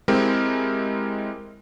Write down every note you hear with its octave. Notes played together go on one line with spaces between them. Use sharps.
G#3 C4 E4 G4 A#4